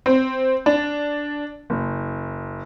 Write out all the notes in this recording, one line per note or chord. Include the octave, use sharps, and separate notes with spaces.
C4
D4
F#1